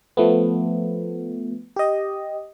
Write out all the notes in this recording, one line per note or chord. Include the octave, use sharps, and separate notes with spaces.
F3 A3 B3
G4 D#5